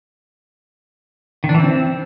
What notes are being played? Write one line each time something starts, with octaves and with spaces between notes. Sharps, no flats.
D#3
D4
E3
C4